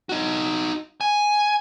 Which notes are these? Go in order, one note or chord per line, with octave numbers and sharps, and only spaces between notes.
D#4 F#4
G#5